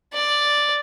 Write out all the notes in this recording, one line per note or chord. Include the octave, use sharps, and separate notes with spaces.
D5